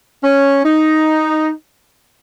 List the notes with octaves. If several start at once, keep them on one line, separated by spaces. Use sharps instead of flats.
C#4
D#4